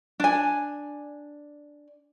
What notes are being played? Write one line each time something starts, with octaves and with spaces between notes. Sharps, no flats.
D4 G#5